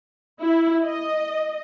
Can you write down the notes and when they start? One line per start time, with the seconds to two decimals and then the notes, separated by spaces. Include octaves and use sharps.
0.41 E4
0.86 D#5